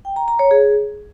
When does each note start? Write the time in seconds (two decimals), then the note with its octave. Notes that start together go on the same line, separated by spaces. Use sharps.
0.05 G5
0.16 A#5
0.28 A#5
0.39 C#5
0.51 G#4